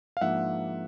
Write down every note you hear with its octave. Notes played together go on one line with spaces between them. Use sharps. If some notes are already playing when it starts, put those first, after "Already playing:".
F5
G#2 F3 A#3 D4 E5 F#5